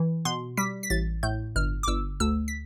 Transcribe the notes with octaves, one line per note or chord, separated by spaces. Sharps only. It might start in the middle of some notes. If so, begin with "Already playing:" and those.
Already playing: E3
B2 C6
G3 B6
B6
A1 A6
A2 G6
G1 F6
D6
G1 E6
D2 E6
B6